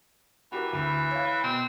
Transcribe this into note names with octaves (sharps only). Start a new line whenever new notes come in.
E3 F#4 G4 A#4
D2 E3
C#5 F5
B2 C4